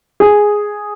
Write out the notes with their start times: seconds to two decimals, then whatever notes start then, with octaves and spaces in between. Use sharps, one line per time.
0.20 G#4